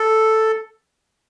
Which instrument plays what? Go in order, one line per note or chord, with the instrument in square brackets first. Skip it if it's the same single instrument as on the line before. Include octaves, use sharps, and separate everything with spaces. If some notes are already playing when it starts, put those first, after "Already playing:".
Already playing: [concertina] A4